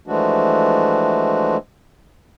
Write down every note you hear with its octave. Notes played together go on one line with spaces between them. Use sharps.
E3 F3 G#3 A3 D4 F#4